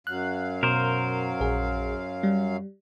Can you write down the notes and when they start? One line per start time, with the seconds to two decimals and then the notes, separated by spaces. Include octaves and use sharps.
0.07 F#2 F#3 F5 F#6
0.63 B2 A#4 C5
1.40 A#1 G#4
2.23 G3